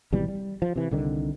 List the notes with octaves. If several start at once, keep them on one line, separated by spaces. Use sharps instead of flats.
G#1 B2 E3 G3
G3
F3
C3 E3
C2 D3 D#3